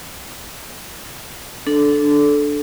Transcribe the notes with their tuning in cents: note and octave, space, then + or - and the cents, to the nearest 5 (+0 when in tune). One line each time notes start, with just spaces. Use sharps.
D4 +0 A4 -15